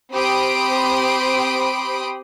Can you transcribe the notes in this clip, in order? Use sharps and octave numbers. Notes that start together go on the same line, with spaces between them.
C4 G4 B5 C6 D#6 D7